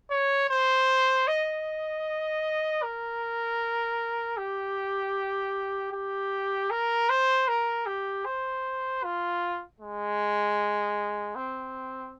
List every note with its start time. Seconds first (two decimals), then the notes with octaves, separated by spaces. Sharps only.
0.11 C#5
0.50 C5
1.28 D#5
2.83 A#4
4.37 G4
5.93 G4
6.71 A#4
7.10 C5
7.48 A#4
7.86 G4
8.25 C5
9.04 F4
9.81 G#3
11.36 C4